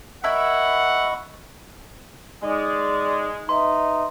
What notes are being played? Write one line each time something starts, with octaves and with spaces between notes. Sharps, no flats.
E4 A#4 D#5 E5 F#5 B5 C#6
G#3 D#4 D5
D#4 B4 D#5 E5 C6